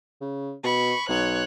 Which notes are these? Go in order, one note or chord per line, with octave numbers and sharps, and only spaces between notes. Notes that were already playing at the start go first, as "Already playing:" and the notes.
C#3
B2 B5 C#6
B1 C#5 F#6